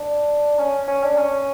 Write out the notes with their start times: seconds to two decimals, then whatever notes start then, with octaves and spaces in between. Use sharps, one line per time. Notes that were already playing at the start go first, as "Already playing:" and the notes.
Already playing: D4
0.58 C#4
0.88 C#4
1.03 D4
1.18 C#4